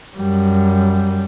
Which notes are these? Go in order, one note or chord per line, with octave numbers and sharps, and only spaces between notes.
F#2 G3